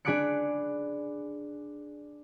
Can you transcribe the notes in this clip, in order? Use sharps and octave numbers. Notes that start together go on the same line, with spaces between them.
D4 G#4 B5 D6 F#6 C#7